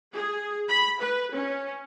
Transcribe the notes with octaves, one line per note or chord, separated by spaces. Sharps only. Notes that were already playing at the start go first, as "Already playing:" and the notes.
G#4
B5
B4
C#4